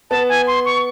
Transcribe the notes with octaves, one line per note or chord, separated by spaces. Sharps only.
B3 A5
G#5
C6
C#6